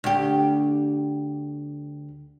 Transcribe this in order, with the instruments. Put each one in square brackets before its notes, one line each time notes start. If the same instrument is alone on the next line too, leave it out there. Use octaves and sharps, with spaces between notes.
[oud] D2 G4